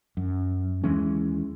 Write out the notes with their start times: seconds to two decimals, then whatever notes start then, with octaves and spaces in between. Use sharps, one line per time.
0.17 F#2
0.84 D#2 E3 G#3 C#4